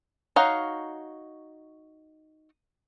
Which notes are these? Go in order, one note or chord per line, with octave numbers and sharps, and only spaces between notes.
D#4 F#4 C#5 F5